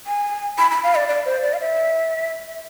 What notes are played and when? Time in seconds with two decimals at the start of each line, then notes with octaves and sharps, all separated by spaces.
0.07 G#5
0.58 B5
0.71 B5
0.84 F5
0.95 D5
1.08 D5
1.26 C5
1.43 D5
1.54 F5
1.60 E5